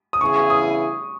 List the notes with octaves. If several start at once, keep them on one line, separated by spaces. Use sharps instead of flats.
D#6
C#3 E3 B3 E4 G#4 C#6
C#6
D#6